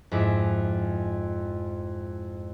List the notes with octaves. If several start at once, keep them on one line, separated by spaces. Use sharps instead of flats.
F2 G#2 G#3 E4 D6